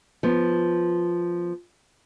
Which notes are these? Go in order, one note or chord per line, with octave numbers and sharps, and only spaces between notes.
F3 B3